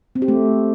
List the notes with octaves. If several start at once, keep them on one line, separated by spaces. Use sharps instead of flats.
C4
G4
A3